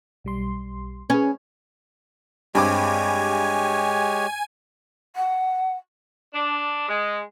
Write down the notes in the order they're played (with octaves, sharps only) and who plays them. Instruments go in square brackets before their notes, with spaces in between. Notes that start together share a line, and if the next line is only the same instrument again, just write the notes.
[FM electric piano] B1 G3 C6
[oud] C#4 [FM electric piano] G#4 B4
[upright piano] G2 C4 D6 [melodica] G#3 G4 C#5 [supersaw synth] G#5
[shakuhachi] F#5
[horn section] D4
G#3